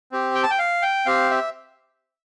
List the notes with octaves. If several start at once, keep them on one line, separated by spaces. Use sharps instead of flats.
C4 G4
G5
A5
G5
F5
G5
C4 G4 F5
E5